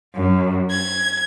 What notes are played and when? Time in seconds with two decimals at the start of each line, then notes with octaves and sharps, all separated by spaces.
0.15 F#2
0.71 G#6